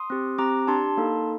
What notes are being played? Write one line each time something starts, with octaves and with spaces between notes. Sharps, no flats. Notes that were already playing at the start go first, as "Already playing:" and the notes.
Already playing: C6 D#6
C4 G4
C4 G4 A#5 D6
D4 G4 A5 C6
A#3 D#4 A4